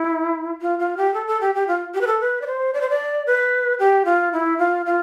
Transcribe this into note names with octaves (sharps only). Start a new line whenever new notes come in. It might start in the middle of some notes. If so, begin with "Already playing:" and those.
Already playing: E4
F4
F4
G4
A4
A4
G4
G4
F4
G4
B4
A4
B4
D5
C5
D5
C5
D5
B4
G4
F4
E4
F4
F4